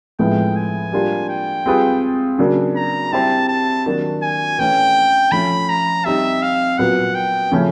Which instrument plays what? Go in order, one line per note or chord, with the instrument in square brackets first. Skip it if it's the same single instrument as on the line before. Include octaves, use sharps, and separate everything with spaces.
[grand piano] A2 F3 G#3 B3 E4 [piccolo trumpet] G5
[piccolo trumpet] G#5
[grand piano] G3 A#3 D4 F4
[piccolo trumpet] G5
[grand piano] G3 C4 F4 G#4 B4
C#3 F#3 A#3 D4
[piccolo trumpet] A#5
[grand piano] G3 C4 E4 G4 C5 [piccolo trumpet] A5
[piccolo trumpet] A5
[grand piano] D#3 F#3 A#3 D4 F#4
[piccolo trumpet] G#5
[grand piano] E3 A3 C#4 [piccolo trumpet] G5
[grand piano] F3 A3 C#4 [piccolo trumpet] B5
[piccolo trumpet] A#5
[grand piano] G3 C4 D#4 [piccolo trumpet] E5
[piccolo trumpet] F5
[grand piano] A#2 F#3 B3 [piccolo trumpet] F#5
[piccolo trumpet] G5
[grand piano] C#3 F3 A3 C#4